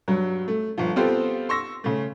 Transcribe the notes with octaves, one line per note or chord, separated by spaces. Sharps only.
G2 F#3
A3
G1 F3
B3 C4 F4 G4 A4 C5
C6 C#6 E6 A#6
C#3 A3